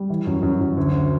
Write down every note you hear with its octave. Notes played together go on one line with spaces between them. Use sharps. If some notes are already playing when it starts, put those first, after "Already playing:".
Already playing: G3
E3
F#2
F#2
F#2
D2
D2